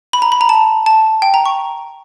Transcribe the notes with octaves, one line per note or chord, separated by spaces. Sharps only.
B5
A#5
B5
A#5
A5
A5
G5
A#5
C#6